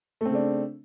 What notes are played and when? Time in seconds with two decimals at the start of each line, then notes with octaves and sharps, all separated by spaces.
0.21 A3
0.25 C4
0.30 C#3
0.35 D4